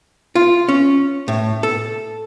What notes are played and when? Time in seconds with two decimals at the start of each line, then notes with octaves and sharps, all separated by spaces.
0.35 F4
0.68 C#4
1.28 A2
1.63 A4